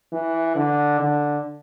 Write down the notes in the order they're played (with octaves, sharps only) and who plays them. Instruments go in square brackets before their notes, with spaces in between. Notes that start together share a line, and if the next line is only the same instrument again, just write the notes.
[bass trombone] E3
D3
D3